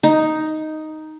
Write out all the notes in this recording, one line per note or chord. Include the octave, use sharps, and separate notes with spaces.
D#4